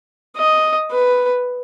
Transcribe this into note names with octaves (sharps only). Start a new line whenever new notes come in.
D#5
B4